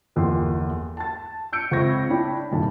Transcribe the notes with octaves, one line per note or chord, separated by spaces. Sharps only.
G1 E2 F3 A#3 G5 C6
A5 A6
E6 G6 C#7 D7
C#2 C4 E5 C#6 G#6 A#6
D4 E4 C#5 G5 B5
D#1 G2 C3 D#3 A5